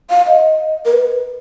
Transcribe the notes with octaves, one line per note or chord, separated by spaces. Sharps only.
F5
D#5
A#4
B4